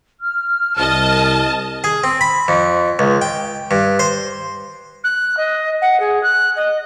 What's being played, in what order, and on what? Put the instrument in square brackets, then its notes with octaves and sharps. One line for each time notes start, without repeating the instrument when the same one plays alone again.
[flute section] F6
[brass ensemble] C2 [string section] D#5 A5
[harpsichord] G#4
C4
B5
F2
C#2
G5
G2
C5
[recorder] F#6
D#5
F#5
G#4
F#6
D#5